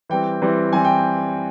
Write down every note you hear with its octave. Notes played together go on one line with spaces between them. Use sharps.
E3 G3 C4 G5
E3 G3 C4
E3 G3 C4 G#5
G5